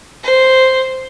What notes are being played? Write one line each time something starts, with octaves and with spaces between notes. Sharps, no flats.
C5